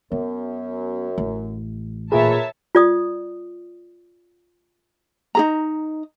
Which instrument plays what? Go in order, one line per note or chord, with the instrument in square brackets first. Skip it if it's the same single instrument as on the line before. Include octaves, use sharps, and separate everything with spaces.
[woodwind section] F#2 [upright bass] B3
[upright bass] A1
[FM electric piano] A#2 F4 G#4 [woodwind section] A#4 B4 [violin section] C#5 E5 A5
[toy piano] F4 D5 D#6
[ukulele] D#4 G#4 A#5